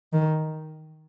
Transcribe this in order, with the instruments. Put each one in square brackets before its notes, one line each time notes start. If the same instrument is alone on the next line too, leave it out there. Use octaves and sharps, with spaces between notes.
[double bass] D#3